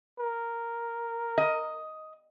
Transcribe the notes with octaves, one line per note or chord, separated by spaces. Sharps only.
A#4
D#5